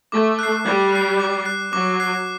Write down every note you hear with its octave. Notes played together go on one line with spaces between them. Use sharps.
A3 D6
F#6 C7
G3 D6
F#6 C7
D6
F#6 C7
F#3 D6
F#6 C7